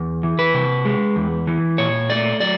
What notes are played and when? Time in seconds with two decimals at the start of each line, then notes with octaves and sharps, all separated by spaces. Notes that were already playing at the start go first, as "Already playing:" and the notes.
Already playing: E2
0.23 E3
0.39 B4
0.54 C3
0.85 G#3
1.16 E2
1.47 E3
1.78 A#2 C#5
2.10 A3 D5
2.40 F#3 D5